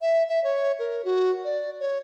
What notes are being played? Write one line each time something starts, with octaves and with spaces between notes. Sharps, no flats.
E5
E5
C#5
A#4
F#4
D5
C#5